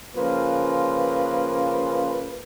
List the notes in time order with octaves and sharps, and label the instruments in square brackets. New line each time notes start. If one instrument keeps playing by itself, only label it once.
[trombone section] C#3 F3 A#3 F4 B4